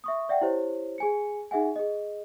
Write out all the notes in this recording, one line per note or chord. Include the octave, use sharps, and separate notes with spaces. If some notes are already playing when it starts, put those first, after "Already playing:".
E5 C#6 D#6
D5 E5 F#5 G5
E4 G4 C5 C#5
G#4 G#5 C#7
D#4 G#4 E5 F#5 G#5
G#4 D#5